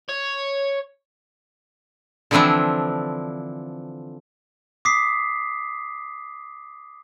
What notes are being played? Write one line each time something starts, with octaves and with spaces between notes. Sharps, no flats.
C#5
D3 E3 F3 C4 D4 E4
D6 D#6 B6 C7